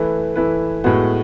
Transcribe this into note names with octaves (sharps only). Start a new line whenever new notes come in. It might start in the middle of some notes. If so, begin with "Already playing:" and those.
Already playing: E3 A3 E4 B4
E3 A3 E4 B4
A2 G#3 B3 F#4